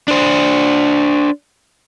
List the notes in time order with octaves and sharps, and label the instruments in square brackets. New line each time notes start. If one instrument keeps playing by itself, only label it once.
[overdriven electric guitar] D4 C5